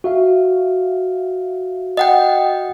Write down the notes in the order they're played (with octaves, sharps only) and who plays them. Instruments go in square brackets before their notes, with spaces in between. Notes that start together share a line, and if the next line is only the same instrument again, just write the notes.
[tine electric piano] F#4 E5 F5
[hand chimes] D#5 F#5 G5